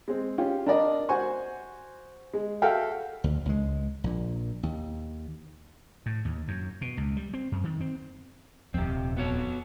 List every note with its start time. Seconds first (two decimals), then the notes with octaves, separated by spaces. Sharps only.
0.08 G#3 C4
0.38 C#4 F4 G4
0.67 D4 A#4 D5 D#5
1.09 F#4 C5 G#5 C#6
2.34 G#3
2.62 F#4 A4 E5 F5 G5
3.24 D2
3.45 C#2 G#3
4.04 A#1 A#2
4.63 D#2
6.06 A2
6.25 D#2
6.48 F#2
6.81 B2
6.97 C#2
7.17 G3
7.33 C4
7.52 F#2
7.64 D#3
7.81 C4
8.74 D#1 F2 C3 C4
9.17 B3 F#4 C#5